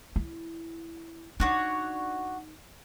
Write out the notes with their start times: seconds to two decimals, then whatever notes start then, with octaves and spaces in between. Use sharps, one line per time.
0.16 E4
1.40 D4 D#4 F#4 C#5